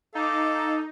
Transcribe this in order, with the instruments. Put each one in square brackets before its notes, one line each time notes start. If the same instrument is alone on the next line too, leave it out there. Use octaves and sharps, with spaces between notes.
[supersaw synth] D#4 [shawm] A4 [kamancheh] F5 D6